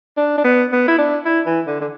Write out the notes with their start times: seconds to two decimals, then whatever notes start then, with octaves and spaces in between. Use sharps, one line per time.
0.17 D4
0.38 D4
0.44 B3
0.72 B3
0.88 E4
0.98 D4
1.25 E4
1.46 E3
1.67 D3
1.81 D3